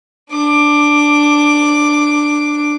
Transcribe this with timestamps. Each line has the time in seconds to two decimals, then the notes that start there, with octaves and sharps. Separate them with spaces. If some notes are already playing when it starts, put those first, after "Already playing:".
0.31 D4 D6